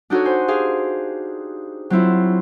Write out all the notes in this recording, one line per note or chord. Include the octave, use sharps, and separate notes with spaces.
D4 D#4 F#4 A4 C#5
C5 G#5
G4 G#4 F5
F#3 C4 E4 F4